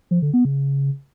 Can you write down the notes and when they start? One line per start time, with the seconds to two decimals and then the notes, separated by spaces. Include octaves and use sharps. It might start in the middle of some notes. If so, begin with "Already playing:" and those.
0.11 F3
0.22 D3
0.34 B3
0.45 C#3